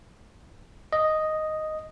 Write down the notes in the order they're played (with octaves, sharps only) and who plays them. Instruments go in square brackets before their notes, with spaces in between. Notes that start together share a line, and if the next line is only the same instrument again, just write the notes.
[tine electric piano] D#5